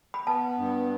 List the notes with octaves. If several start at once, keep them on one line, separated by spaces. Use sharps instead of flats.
B5
B3 A5
G2